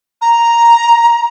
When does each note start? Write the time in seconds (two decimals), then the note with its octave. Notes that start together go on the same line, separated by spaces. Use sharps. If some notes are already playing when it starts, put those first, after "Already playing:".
0.21 A#5